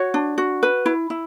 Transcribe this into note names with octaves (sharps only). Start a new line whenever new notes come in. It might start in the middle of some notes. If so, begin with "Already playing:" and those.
Already playing: F#4 C#5
D4
F#4
B4
E4
E4